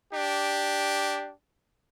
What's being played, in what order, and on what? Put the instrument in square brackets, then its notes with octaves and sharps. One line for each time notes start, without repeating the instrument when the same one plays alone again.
[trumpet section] D4 G4